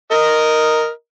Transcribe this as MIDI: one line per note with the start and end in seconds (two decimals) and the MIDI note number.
0.12 0.89 70
0.12 0.89 75